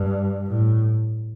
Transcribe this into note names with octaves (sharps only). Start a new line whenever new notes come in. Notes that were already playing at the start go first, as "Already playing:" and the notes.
Already playing: G2
A2